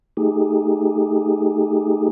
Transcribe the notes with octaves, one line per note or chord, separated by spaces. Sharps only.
A3 D#4 G4 G#4